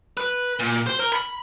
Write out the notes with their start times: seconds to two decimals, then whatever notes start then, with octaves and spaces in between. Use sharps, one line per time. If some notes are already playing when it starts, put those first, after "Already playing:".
0.17 B4
0.59 A#2
0.87 C5
1.00 A#4
1.13 B5